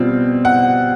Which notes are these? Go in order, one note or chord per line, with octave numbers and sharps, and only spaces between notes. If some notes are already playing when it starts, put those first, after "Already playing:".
Already playing: B2 G3 C4 F4
F#5